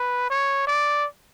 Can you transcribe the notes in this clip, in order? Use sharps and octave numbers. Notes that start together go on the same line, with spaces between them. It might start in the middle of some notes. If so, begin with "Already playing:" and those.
Already playing: B4
C#5
D5